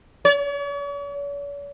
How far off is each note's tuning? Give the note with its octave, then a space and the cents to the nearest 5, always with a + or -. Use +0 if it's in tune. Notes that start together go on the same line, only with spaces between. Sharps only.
C#5 +45